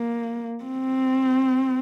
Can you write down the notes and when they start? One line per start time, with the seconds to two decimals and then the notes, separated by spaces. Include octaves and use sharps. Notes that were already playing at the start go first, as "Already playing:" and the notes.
Already playing: A#3
0.64 C4